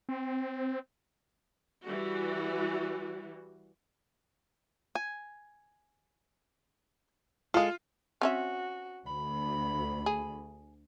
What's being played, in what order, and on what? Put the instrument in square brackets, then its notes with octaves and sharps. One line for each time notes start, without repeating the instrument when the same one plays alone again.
[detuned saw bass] C4
[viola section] E3 G3 F#4
[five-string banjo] G#5
[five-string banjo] G#3 A4 [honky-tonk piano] F4
[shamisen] C4 C#4 E5 [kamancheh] F#4
[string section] D2 [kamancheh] B5
[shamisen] G#4